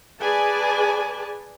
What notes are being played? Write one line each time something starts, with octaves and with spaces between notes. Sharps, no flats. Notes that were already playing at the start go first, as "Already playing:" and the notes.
G#4 B4 D5 G#5 A5